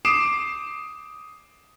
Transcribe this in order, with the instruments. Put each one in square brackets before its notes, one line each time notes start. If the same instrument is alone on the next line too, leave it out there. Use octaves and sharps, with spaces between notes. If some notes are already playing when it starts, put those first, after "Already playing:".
[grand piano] D6 D#6 C7 D7 E7